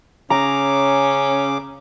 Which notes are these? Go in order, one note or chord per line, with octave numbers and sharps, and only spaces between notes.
C#3 C#4 A#5 D6